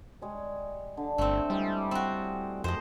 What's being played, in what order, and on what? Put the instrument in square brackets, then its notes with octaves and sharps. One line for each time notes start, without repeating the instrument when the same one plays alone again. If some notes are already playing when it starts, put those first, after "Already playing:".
[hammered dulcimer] G3 G#3 C#5
D3
[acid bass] G1 [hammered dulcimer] D3 C5 [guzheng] A3 C4
[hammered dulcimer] A2 G#3 D5 [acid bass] G3
[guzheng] C4 F#4
[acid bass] F2 [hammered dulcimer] A3 G4 A#4 [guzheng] C5 D#5